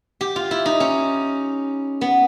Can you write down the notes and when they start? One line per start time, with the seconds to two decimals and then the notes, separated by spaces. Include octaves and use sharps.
0.21 G4
0.36 F4
0.51 E4
0.66 D#4
0.80 C#4
2.01 B3